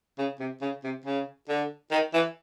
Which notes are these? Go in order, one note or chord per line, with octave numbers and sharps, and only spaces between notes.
C#3
C3
C#3
C3
C#3
D3
D#3
E3